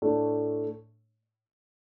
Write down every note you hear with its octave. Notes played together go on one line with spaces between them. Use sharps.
A2 A3 D4